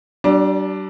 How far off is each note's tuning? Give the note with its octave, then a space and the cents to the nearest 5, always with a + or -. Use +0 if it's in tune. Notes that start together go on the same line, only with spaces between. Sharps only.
G3 -40 D4 +0